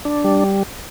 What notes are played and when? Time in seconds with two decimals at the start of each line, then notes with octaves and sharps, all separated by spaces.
0.05 D4
0.24 G3